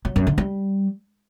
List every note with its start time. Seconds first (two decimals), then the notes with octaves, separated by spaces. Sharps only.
0.05 F#3
0.16 F#2
0.27 D3
0.38 G3